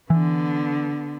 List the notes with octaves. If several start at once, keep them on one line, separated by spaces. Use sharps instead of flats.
D3 E3 B3